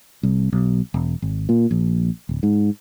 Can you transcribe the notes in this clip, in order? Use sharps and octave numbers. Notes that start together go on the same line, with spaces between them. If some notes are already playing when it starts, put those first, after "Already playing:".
C2
B1
E1
G#1
A#2
A#1
D1
G#2